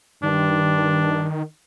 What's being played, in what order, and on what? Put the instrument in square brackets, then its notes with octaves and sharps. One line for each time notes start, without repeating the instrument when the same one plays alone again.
[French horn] G2 [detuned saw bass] D#3 [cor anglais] D4